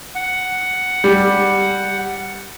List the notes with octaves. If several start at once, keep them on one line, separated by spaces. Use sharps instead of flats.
F#5
G3